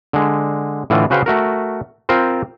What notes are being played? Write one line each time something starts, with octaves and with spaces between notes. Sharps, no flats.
D3 G#3
A2 D3 E3 F4
C#3 F#4 B4 C5 F5 G5
A3 F#4 A#4
C4 F4 A#4 C5